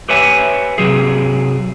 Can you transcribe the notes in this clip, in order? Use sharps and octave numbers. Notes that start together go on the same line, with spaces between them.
G4 B4 C#5 E5 G#5
C3 F#3 G#4